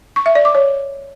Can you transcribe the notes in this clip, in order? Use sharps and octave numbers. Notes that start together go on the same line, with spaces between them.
C#6
E5
D5
D6
C#5